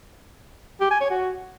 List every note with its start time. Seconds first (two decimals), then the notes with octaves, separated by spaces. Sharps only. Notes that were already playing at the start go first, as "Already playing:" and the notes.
0.81 G4
0.91 G#5
1.01 C#5
1.10 F#4